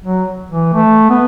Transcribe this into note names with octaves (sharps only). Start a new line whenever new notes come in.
F#3
E3
A3
B3